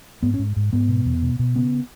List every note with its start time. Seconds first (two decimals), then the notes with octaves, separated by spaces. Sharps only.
0.23 G#2 B3
0.34 C#4
0.39 G#2
0.56 G#2
0.73 G#2 B3
0.89 B2
1.06 E2
1.23 B2
1.39 B2
1.55 C#3 B3